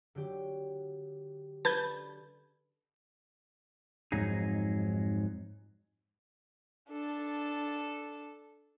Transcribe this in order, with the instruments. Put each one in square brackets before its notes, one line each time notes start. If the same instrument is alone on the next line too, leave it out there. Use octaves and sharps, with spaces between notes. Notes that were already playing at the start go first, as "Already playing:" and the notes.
[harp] D3 F#3 G4
[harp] D4 A4 [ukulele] B4 [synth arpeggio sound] A5 G6 G#6
[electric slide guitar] F2 G#2 F#3 D#4 G#4
[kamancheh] D4 A4